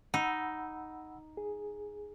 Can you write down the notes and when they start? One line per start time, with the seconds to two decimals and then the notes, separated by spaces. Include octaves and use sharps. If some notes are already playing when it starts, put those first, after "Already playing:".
0.14 D#4 F#5 B5 E6
1.37 G#4